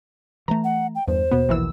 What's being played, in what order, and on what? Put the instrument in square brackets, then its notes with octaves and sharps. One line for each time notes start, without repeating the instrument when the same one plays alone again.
[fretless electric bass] E3 F3 A3 [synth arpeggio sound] A#5
[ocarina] F#5
G5
[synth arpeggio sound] E2 [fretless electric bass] G2 [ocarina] C5
[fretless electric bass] D#2 B2 [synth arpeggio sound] B3
[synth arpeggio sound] A#1 E3 E6